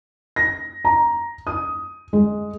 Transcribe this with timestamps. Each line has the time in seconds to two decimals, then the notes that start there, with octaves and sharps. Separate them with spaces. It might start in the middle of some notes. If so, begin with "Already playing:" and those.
0.36 A#6
0.85 A#5
1.47 D#6
2.13 G#3